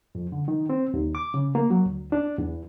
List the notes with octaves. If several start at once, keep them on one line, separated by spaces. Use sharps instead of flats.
F2
D3
D#3
C4
D#2
D6
C#3
A#3
F#3
D2
D4
E2